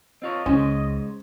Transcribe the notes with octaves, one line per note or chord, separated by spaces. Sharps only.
C4 F4 C#5 D#5
C#2 G#3 C#4 C5